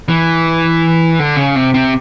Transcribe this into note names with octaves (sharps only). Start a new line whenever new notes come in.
E3
D3
C#3
C3
C3